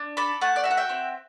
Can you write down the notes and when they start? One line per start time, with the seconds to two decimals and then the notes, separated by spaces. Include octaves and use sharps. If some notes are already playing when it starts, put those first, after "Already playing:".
Already playing: D4
0.17 A4 B5 D6
0.41 A3 F#5 A5
0.56 D5
0.64 F#4 E5
0.71 F#5
0.77 E5 G5
0.89 C4